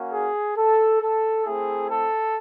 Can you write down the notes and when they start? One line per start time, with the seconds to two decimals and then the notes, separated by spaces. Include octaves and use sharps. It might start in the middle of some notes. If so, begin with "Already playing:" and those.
Already playing: A#3 C#4 F#4
0.12 G#4
0.57 A4
1.01 A4
1.45 A3 C4 E4 G#4
1.90 A4